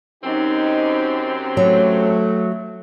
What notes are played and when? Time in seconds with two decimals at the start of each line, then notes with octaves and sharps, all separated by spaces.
0.24 F#2 C4 D#4 G4
1.57 F#3 A3